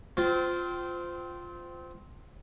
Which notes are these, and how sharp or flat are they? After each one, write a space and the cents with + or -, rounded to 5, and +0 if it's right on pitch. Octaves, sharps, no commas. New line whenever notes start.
C4 -20 F4 +0